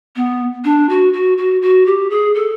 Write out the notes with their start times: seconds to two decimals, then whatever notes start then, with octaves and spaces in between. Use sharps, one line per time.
0.16 B3
0.65 D4
0.89 F#4
1.13 F#4
1.38 F#4
1.62 F#4
1.86 G4
2.10 G#4
2.34 A4